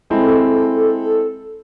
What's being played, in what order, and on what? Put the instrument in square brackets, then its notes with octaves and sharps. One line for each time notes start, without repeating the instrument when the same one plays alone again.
[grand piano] G#3 C4 E4 [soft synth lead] A4